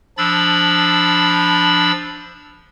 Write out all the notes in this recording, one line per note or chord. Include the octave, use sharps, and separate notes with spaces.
F3 D4 B5 E6 A6